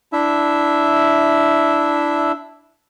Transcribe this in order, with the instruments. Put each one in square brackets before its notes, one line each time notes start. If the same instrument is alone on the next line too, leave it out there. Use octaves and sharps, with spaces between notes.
[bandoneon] D4 E4 E5